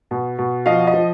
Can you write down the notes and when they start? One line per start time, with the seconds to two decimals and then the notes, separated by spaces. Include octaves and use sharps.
0.11 B2
0.39 B2
0.66 F3 D#5 F5
0.87 D#5
0.94 F3